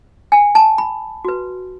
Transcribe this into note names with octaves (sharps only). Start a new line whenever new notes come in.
G#5
A5
B5
F#4 B4